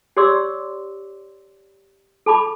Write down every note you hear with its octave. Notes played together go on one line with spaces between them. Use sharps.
G4 C#5 D5 C6 D6 E6
A4 A5 B5 D6